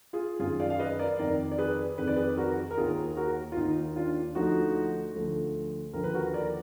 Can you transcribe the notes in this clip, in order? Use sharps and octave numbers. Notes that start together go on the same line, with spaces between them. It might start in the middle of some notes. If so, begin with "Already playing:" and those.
F4 G#4
F#2 D#3 F4 G#4
D5 F5
F5
B4 D#5
A#4 D5
F2 D#3 A#4 D5
D5
G#4 B4
F2 D#3 B4
D5
G#4 B4
F#4 A#4
A#4
D#2 D#3 F4 G#4
F#4 A#4
F4
D#2 D#3 D#4
D4 F4
D2 D3 F3 D#4 F#4
D2 D3 F3
D#2 D3 F3 A#4
B4
F#4 A#4
A#4 D5